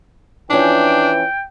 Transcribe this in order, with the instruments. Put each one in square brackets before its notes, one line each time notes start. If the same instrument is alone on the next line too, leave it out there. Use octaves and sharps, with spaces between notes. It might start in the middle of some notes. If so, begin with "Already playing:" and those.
[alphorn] E3 [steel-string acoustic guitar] F3 C#4 [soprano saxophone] D4 [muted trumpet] G5